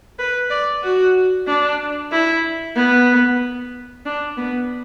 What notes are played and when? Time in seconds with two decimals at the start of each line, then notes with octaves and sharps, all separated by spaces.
0.19 B4
0.50 D5
0.83 F#4
1.47 D4
2.12 E4
2.76 B3
4.05 D4
4.37 B3